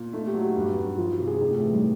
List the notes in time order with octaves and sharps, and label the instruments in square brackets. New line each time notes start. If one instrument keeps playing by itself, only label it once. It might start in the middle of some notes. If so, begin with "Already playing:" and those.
Already playing: [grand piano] A#2
[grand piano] A3 [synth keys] D#4
[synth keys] G4
[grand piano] F#3
[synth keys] F#4
[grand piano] G2
G2
[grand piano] F3 [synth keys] F4
[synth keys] F#4
[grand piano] C3
[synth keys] G#4
[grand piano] A2 [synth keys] D#4
[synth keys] A3
[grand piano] E3 [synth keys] A3
[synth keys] G3